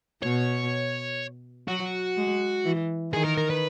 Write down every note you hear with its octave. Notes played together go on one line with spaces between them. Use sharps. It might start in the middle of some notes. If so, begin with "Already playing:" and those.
B2 C#5
F#3 F#4
G#3
E3
D#3 G#4
A#4
A#4
B4